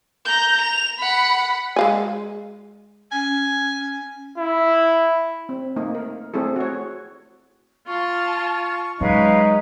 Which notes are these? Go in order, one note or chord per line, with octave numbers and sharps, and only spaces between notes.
A#5 G6
F7
F#5 B5
G#3 F5 G#5
C#4 G#5
E4
C4
A3 A#3 D#4
A#4
A3 C4 E4 G#4 A4
F#4 C#5
F4 A5 C#6
F#3 G#3 C#4 D#4 B4 F5